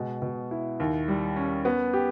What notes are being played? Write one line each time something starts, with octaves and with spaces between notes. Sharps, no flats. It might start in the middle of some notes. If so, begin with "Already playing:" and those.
Already playing: B2 G#3
B2
E4
D#2
G3
C#4
B3
G4